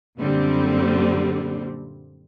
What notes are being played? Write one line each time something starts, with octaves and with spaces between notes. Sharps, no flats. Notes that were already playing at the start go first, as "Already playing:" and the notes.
F#2 A#2 D3 G3 C4